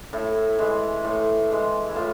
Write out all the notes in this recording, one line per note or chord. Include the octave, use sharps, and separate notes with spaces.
A2 E4
E3 G#3
A2
E3 G#3
E4
A2 F4